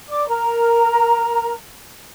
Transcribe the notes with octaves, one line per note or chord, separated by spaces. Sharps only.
D5 D6
A#4 A#5